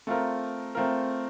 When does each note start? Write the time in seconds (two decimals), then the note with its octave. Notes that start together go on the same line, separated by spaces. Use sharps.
0.07 A3 C4 F4 A#4
0.75 A3 C4 F4 A#4